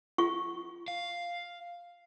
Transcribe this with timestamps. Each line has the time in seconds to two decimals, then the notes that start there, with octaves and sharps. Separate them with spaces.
0.18 F4 C#6
0.88 F5